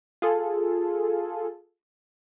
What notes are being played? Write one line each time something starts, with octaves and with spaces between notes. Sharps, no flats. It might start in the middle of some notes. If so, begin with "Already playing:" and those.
F4 G#4 A4